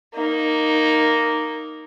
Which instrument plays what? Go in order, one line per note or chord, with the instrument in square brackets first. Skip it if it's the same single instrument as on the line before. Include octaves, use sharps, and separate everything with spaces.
[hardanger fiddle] A#3 D#4